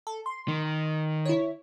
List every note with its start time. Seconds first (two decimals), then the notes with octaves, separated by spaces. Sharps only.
0.07 A4
0.26 C6
0.48 D#3
1.25 E4 C#5